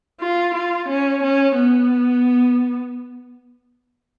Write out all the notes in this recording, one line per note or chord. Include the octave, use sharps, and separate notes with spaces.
F4
F4
C#4
C#4
B3